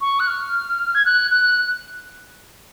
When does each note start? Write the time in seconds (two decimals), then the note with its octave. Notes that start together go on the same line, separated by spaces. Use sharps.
0.01 C#6
0.20 F#6
0.27 F6
0.95 G#6
1.05 F#6
1.31 F#6